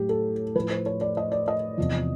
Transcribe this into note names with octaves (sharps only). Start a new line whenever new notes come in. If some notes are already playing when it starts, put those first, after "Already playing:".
Already playing: A2 F#3 G4
A4
A2 F3 B4
C5
C#5
D5
D#5
D5
D#5
E2 C3 F3